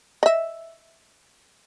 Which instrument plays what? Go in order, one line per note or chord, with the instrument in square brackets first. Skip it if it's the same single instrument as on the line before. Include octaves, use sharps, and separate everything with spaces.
[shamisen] D#5 E5